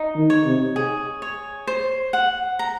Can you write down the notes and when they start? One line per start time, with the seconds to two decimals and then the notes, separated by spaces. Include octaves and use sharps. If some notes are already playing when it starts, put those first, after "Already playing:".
Already playing: D#4
0.15 D#3
0.30 C#5
0.45 C3
0.76 G#4
1.22 C#5
1.67 C5
2.13 F#5
2.59 A#5